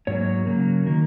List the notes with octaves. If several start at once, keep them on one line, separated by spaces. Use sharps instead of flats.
G#2 F#3 A#3 C#5
C#3 F#3 A#3
D#3 A#3